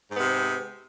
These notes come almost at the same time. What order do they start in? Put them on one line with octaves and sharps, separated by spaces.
G#2 B3 C3